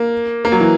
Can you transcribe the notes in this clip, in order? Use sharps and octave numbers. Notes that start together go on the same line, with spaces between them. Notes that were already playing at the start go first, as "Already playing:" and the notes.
Already playing: A#3
A#3
F#3
E3